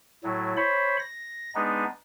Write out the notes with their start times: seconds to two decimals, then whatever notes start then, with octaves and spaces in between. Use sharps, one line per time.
0.24 A2 F#3
0.57 C5 C#5 B5
0.99 A#6
1.55 G#3 B3 D4 D#4